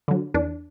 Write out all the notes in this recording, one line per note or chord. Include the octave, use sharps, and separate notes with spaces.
D3 F#3
E2 D4